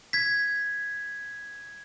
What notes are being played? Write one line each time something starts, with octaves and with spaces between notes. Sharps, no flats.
G#6 B6